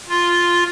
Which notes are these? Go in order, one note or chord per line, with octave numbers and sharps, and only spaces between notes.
F4